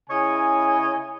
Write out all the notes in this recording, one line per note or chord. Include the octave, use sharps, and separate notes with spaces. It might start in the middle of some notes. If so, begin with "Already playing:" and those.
C#3 E4 C#5 D#5 G#5